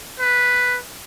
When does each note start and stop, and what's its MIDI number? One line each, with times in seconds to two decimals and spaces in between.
0.20 0.78 71